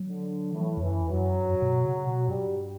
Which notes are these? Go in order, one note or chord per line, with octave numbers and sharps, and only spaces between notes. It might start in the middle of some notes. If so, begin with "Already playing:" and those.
Already playing: F#3
D3
A2 E3
E2
F#2 E3
E2
F#2 F#3
G2
F#2
G2
B2
C#3
B2
G2 G3